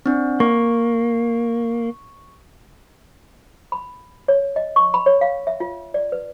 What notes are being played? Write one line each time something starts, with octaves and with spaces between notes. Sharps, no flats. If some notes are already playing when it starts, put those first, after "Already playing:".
C4 D4
A#3 C#6
B5
C#5
D#5
C#6
B5
C#5
F5
E5
F4
D5
B4